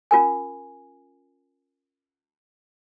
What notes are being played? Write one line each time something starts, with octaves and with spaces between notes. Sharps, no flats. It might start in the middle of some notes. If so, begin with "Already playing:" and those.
C#4 F4 A#4 G#5